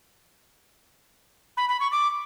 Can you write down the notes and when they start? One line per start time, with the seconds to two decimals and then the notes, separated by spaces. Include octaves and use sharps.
1.57 B5
1.69 B5
1.80 C#6
1.92 D6